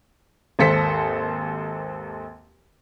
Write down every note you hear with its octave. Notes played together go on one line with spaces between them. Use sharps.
G#1 D#2 A4 C5 B6 C#7